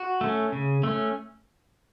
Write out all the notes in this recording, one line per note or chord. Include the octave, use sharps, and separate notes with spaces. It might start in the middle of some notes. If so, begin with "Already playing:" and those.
Already playing: F#4
A3 C#4
C#3
A3 C#4